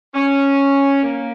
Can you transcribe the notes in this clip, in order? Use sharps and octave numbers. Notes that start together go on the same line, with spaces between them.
C#4
A#3